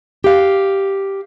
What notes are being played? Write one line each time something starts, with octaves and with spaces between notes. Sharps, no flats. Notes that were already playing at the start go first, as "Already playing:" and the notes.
G4 F5